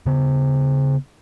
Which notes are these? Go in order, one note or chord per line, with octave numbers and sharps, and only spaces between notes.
C#3 B3